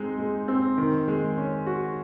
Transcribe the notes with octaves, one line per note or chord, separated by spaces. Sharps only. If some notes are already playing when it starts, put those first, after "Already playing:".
Already playing: G#3 C4 D#4
G#3
C4
D#3
G#3
C#4
F#4